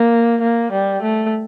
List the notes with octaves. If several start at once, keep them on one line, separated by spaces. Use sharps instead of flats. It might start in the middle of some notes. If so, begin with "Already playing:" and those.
Already playing: A#3
A#3
G3
A3